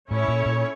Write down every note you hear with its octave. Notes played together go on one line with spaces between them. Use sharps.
A2 C#4 E4 A4 C#5
A#2
A#2